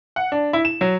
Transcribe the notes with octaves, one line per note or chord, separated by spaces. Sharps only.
F#5
D4
E4
E7
F#3